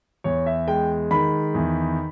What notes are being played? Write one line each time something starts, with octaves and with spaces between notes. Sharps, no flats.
E2 C#5
E5
G#3 G5
D#3 B5
E2